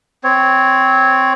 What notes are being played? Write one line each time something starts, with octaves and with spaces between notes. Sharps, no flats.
C4 C#5